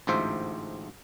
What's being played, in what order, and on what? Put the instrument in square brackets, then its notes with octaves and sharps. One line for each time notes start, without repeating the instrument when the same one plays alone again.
[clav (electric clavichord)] A1 D2 G#2 F4 C5 E5